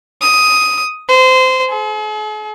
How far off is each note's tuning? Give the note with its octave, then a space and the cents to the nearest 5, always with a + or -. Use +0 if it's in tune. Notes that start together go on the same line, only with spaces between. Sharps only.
D#6 +5
C5 -20
G#4 +45